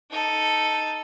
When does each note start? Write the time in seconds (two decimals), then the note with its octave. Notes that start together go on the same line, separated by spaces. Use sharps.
0.11 D#4 A4